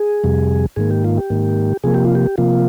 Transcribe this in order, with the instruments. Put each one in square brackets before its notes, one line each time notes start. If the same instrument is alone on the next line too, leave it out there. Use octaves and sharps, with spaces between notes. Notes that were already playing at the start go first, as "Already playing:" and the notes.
Already playing: [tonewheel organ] G#4
F2 C3 G3
G#2 D#3 A#3 G#4
G4
F4
G4
G#2 D#3 A#3
C3 F3 A#3 G#4
G4
F4
G4
C3 F3 A#3 F4